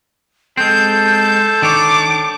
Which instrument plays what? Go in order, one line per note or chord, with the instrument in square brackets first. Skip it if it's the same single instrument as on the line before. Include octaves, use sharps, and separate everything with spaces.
[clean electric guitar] G#3 C4 [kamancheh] A4 [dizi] G6
[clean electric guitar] D#3 D4 C#5 [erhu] D6